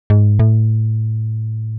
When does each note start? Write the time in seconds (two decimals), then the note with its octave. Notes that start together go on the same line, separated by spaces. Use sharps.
0.10 G#2
0.39 A2